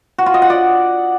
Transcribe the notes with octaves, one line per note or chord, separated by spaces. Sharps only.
F#4
F4
D#5
F#5
D5